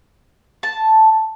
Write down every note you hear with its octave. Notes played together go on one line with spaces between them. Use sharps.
A5